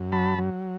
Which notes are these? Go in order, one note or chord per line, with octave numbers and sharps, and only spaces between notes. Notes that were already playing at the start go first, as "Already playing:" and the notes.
Already playing: F#2
F#3 A5 B5
F#3